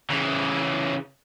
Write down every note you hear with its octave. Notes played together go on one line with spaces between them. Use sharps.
C#3 E3